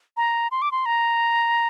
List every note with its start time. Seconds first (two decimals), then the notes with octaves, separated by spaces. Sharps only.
0.17 A#5
0.51 C6
0.62 D6
0.72 C6
0.86 A#5